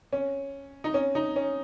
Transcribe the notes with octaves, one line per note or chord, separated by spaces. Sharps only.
C#4
D#4
C#4
D#4
C#4